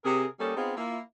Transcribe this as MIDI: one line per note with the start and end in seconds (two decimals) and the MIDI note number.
0.04 0.25 48
0.04 0.25 68
0.04 0.25 70
0.39 0.55 55
0.39 0.55 58
0.39 0.55 61
0.39 0.55 63
0.39 0.55 67
0.39 0.55 69
0.57 0.75 59
0.57 0.75 60
0.57 0.75 63
0.57 0.75 65
0.57 0.75 68
0.77 0.98 58
0.77 0.98 64
0.77 0.98 65